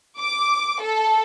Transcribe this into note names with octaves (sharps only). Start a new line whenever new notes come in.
D6
A4